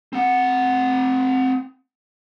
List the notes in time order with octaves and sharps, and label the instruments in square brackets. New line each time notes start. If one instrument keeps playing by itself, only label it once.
[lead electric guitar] C4 F#5